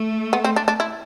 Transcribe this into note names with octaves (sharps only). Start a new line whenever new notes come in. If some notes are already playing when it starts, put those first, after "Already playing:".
Already playing: A3
B3
C4
D4
D4
E4